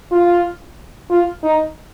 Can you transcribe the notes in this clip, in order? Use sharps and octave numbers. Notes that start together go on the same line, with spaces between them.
F4
F4
D#4